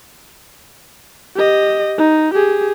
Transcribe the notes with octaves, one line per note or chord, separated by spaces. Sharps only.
G4 D#5
D#4
G4 G#4